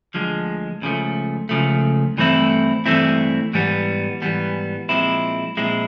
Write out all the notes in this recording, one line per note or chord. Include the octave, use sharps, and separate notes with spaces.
D2 D3 F3 G#3
C#2 C#3 F3 A3
C#2 C#3 F3 A3
G2 E3 A3 C4 E4
G2 E3 A3 C4 E4
G#2 E3 G3 B3
G#2 E3 G3 B3
A#2 F3 G#3 C4 E4
A#2 F3 G#3 C4 E4